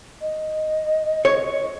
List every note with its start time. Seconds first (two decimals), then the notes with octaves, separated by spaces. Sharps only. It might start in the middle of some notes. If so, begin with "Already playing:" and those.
0.21 D#5
1.25 C#5